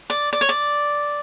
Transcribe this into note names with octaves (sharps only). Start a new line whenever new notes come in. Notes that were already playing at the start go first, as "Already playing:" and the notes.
D5
D5
C#5
D5